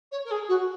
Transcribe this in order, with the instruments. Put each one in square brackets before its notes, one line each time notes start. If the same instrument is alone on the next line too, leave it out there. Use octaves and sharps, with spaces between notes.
[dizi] C#5
A#4
G#4
F#4